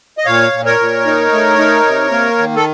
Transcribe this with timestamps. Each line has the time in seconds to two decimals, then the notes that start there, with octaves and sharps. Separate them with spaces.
0.18 D#5
0.26 A#2 C#5 F5
0.52 A#2
0.65 A#4 C#5
0.79 A#2
1.06 D#4
1.32 A3
1.58 D#4
1.86 C3
2.11 A#3
2.38 D#3
2.56 A4